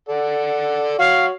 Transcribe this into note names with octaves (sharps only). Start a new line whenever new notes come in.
A4 D5 F#5
F#4 C#5 F5